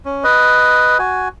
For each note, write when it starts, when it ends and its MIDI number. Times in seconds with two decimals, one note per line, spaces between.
0.05 0.24 61
0.24 0.98 71
0.24 0.98 75
0.99 1.28 66
0.99 1.28 80